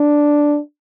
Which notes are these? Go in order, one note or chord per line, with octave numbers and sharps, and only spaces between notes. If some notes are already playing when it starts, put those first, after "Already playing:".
Already playing: D4